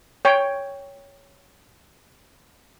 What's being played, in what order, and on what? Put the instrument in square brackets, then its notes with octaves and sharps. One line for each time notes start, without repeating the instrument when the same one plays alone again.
[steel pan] C#5 G5